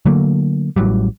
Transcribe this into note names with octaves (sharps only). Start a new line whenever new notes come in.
D3 F#3 A3 A#3
A1 E3 F#3 G3